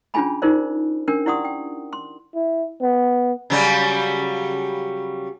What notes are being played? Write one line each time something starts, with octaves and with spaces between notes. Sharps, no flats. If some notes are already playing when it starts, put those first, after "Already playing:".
C#4 D4 F4 G#4 G#5 B5
D#4 F4 G#4 A#4 C5 D5
C#4 D4 A#4 G5
E4 G4 D5 F#5 C6 D#6
G5
C6
E4
B3
C#3 F#3 G3